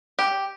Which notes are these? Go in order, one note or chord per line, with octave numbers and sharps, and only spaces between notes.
G4